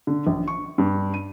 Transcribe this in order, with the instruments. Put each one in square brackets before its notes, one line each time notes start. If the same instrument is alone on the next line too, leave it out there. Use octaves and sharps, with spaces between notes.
[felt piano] D3
A#1
C#6
G2
D#7